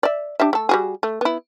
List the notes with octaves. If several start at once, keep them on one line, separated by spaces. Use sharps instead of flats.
D5 E5
D4 G4 E5
A3 A4
G3 F#4 G#4
A3
B3 E4